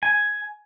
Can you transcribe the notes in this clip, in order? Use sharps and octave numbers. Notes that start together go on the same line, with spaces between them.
G#5